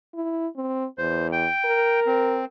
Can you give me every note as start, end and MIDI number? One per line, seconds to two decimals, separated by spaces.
0.14 0.48 64
0.56 0.86 60
0.98 1.47 40
0.98 1.28 72
1.32 2.00 79
1.65 2.43 70
2.06 2.45 60